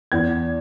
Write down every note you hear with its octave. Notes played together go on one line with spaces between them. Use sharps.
E2 G#6